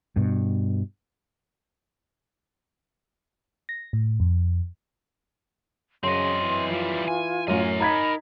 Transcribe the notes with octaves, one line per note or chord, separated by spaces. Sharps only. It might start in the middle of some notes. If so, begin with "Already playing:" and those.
G2 B2
A#6
A2
F2
F#2 C#3 C4 D#5 C6
E3
F3 G3 F4
G#5
F#2 A2 A#4 G#5
D#4 A#5 B5 G#6 B6